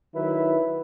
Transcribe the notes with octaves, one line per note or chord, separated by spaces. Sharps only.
D#3 F#3 E4 B4